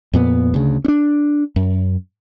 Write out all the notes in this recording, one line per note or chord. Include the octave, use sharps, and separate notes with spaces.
F2 A#2 B3
D2 C#3
C#4 D4
F#2